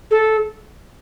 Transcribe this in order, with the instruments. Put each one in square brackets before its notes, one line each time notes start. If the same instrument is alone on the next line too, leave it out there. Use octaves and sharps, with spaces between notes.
[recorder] A4